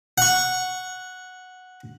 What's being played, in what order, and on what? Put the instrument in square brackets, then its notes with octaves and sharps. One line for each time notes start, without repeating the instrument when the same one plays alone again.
[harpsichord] F#5 C#6